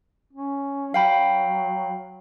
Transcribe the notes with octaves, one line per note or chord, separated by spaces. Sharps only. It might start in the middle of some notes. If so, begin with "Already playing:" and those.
C#4
F#3 F5 G5 B5